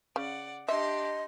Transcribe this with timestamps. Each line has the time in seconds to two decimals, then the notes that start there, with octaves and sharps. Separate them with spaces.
0.16 C#3 D5 F#5
0.68 D4 G4 D#5 E5 C6